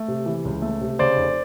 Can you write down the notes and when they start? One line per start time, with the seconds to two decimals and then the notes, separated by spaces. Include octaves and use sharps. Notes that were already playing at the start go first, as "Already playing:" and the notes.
Already playing: A3
0.08 C3
0.26 E3
0.45 C#2
0.62 A3
0.81 C3
0.99 C#3 C5 D5
1.17 F1